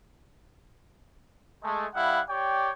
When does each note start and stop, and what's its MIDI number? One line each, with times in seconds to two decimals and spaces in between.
1.62 1.85 56
1.62 1.85 57
1.93 2.21 55
1.93 2.21 64
1.93 2.21 77
1.93 2.21 78
2.29 2.70 67
2.29 2.70 73
2.29 2.70 74
2.29 2.70 79